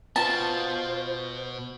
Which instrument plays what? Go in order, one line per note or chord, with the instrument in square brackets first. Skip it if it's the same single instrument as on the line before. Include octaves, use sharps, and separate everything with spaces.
[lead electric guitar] B2 B3 [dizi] F4 [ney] C5 [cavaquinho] A5